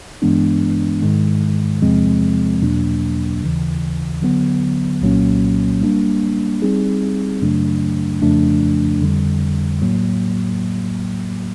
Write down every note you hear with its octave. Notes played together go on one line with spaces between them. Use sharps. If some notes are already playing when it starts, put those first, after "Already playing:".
G2 E3 G#3 B3 D4
G#2 D#3 G#3
E2 C3 F3 G#3 C4
E2 B2 F#3 A#3 D4
D#2 C#3 E3
D3 F#3 B3
C2 A#2 F#3 A#3 C#4
G3 A#3 D4
G3 C4 D#4 G#4
F#2 C#3 F#3 A3 D4
F2 C#3 F3 A3 D4
F2 D3 G3
A2 F#3 A#3